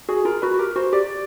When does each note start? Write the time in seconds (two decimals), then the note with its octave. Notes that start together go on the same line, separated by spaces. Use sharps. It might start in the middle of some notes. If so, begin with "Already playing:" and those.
0.09 F#4 G#4
0.25 F4 A#4
0.42 F#4 B4
0.54 F#4
0.59 G4 A#4
0.76 F#4 C5
0.93 G4 D5